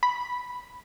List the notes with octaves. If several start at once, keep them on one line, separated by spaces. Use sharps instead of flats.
B5